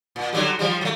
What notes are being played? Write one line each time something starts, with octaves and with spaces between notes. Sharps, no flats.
A#2
D3 F#3 G3
F3 G3
F#3 A3